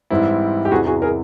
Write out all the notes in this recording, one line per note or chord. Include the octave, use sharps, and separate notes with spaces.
G#2 E3 G3 C4 E4
G4
E2 C3 E3 F#4 G#4
F#4 G#4
G#4 A#4